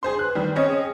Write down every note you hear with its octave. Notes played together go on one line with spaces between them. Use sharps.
D4 G#4 C5 C6
B4 F#6
D#3 G3
C4 C#4 C#5 D#5
G#4